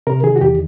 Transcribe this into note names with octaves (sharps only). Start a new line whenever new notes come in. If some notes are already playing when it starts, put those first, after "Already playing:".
C3 A#4
D#3 G#4
F#4
E2 G4